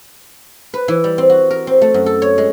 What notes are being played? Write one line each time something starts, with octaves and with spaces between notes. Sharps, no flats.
B4
E3
G3
C4
F#4
A#4
C4
A3
F#2
A4
C#5
G#3